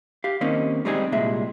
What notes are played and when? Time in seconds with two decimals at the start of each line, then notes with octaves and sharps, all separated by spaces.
0.24 G4 F5
0.41 D#3 A#3 C4 C#4 D#4
0.85 G3 G#3 C4 D#4 G4 G#4
1.12 C2 A#2 G#3 E5